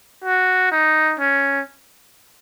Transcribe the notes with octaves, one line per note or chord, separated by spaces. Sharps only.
F#4
D#4
C#4